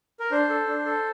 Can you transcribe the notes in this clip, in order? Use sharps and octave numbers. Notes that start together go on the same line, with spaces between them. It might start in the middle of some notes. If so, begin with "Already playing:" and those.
A#4
D4 C5
A4
D4
A4